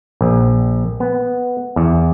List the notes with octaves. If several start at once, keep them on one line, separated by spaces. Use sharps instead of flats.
A#1
B3
E2